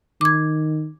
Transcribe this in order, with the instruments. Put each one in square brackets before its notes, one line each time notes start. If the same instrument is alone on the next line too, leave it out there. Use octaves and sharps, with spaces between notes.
[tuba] D#3 [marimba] D6 G#6